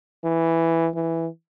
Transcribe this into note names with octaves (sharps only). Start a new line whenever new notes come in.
E3
E3